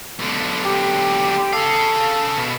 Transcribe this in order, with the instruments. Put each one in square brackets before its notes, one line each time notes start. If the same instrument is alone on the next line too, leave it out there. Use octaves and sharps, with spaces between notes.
[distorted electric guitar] B1 D3
[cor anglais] G4
[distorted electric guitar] G#4 F5 [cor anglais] A4
[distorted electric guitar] B2